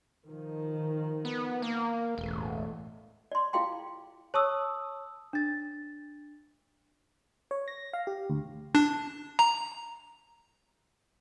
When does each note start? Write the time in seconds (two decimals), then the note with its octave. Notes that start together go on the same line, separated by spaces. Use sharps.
0.22 D#3 F3
1.25 B3
1.62 A#3
2.18 E1 A1 A3
3.32 D5 C6
3.53 E4 F4 G#4 F5 G5 C6
4.34 C#5 A5 C#6 D#6 E6
5.33 D4 A6
7.51 C#5
7.68 A#6
7.93 F5
8.07 G4
8.30 D2
8.75 D4
9.39 A#5